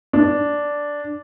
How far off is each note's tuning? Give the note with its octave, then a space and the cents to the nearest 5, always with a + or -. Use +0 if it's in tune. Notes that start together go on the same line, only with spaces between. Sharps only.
D4 -5